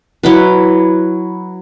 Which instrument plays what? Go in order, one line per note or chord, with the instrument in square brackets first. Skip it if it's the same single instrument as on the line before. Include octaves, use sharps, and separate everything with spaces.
[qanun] F#3 E4 B4